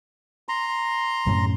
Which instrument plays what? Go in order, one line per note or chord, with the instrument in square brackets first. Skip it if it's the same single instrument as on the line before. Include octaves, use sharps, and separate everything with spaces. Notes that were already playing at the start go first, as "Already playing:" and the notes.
[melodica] A#5 C6
[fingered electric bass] F#2 A2 C#3